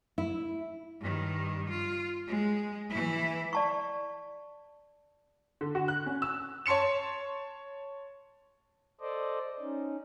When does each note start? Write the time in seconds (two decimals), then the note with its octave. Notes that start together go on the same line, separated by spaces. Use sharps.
0.18 E4
1.01 G2 D#3
1.70 F4
2.28 G#3
2.90 E3 E4
3.53 D5 A5 C#6
5.61 D3
5.75 F#4
5.88 F#6
6.06 C#4
6.22 E6
6.66 C#5 A5 C6 C#7 E7
9.01 A4 C5 D5 D#5
9.60 C#4 D#4